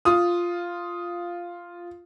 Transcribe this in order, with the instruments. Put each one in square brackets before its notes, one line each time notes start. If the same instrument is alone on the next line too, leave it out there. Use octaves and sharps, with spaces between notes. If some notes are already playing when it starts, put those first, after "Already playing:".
[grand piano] F4 D#6